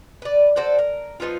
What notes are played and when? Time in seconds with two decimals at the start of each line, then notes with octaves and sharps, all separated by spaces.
0.22 B4 D5
0.56 F#4 A4 C5 D5
0.79 A#4
1.20 F3 B3 D#4 F4